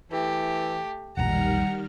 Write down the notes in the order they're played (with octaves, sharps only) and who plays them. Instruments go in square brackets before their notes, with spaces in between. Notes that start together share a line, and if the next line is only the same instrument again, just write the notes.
[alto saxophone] E3 [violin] A3 G4
[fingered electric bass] E1 A#1 [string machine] D#3 G3 F6 [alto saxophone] F#5 [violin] A#5